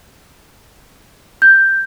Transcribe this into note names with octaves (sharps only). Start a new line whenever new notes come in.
G6